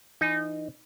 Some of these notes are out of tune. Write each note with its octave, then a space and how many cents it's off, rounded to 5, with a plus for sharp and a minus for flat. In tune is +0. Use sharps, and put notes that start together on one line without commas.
E3 +15 D#4 -15